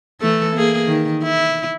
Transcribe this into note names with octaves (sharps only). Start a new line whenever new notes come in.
E3 A3 A4
A#3 G#4
D#3
E4